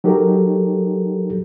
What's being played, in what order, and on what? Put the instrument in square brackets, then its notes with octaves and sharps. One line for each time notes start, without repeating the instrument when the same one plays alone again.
[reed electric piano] F#3 D#4 G4 A4 A#4